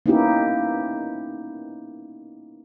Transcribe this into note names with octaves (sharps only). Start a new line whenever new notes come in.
A#3 B3 C#4 D#4 E4 G4